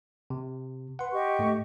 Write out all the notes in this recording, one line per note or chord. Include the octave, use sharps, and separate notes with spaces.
C3
B4 F#5 C6
G4 D#5 C#6
G#2 A3